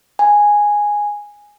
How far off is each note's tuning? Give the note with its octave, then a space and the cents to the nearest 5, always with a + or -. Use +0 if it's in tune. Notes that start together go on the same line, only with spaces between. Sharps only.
G#5 -5